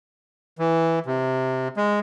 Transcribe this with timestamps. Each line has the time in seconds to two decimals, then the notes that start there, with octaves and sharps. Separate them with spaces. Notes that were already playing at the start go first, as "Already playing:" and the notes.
0.59 E3
1.06 C3
1.77 G#3